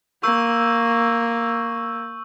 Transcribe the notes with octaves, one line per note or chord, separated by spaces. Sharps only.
A#3 C#6 E6 G6